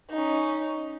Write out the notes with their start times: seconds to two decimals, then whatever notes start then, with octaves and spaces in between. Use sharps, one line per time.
0.11 C#4 D#4